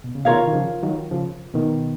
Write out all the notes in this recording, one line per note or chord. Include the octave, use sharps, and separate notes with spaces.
B2
C#3
B2 D#3 F4 A#4 C#5 F5
D#3
C#3 F3
D#3 F#3
C#3 F3
B2 D#3